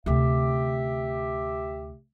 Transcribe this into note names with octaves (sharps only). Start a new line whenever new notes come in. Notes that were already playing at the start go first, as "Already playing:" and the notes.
D2 C3 G4 E5